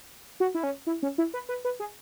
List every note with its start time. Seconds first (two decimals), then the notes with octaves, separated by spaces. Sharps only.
0.40 F#4
0.55 E4
0.63 C#4
0.87 E4
1.03 C#4
1.18 E4
1.34 B4
1.49 B4
1.65 B4
1.80 G#4